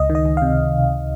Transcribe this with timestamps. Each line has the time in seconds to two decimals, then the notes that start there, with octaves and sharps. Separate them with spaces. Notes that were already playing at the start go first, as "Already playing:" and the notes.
Already playing: C#2 D#5
0.10 D#3
0.15 D#5
0.25 C#2
0.37 C3 F5